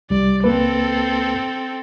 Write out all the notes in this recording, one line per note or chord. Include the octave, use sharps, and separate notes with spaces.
C2 G3 D5
C#2 A#3 C4 A4 B4